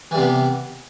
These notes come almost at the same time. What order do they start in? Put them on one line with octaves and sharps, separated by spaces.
E3 G3 C3 B3